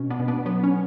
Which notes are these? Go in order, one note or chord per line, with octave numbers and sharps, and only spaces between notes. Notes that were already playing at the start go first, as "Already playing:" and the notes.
Already playing: B2 C#4
B3 D4
B2
B3 D4
F#3 B3
C#4